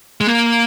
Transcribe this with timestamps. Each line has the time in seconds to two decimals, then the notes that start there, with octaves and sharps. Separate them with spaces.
0.21 G#3
0.27 A#3